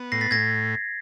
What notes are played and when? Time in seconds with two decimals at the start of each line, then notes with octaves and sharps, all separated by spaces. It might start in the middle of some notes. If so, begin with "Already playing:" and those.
Already playing: B3
0.12 A2 A#6 C7
0.21 A6 B6
0.31 A2 G#6 A#6